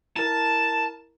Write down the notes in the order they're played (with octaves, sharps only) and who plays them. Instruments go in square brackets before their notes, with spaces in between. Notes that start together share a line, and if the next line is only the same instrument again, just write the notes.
[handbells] E4 A#4 [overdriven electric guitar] A5